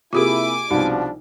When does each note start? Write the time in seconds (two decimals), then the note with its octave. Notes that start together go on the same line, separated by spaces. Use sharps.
0.13 C3 A#3 E4 F4 G4 G#4 G#5 D6
0.71 C2 B2 F3 G3 D4 D#4